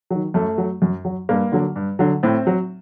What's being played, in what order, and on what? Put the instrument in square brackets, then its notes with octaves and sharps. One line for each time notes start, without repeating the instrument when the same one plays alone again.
[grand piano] D#3 F#3
F#2 A3
F#3
F#2
F#3
G2 A#3
D3 F#3
G2
D3 F#3
A2 C4
F#3